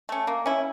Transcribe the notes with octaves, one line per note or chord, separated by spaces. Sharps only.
A3 C#4
A#3
C#4 E4